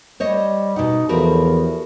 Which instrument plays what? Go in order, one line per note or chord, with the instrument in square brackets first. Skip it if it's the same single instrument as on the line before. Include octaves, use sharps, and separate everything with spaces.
[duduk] G3 [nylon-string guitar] C5 C#5 D#5
[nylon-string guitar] B2 F#5 [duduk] D#4
[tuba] E2 [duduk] F3 [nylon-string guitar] F#4 G4 A#4 [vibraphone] A4 B5